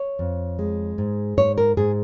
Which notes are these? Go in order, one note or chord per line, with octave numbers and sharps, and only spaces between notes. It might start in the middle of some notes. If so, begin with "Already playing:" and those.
Already playing: C#5
F2
G#3
G#2
G#2 C#5
A#4
G#2 G#4